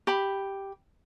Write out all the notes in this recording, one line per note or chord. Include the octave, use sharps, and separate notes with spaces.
G4 B5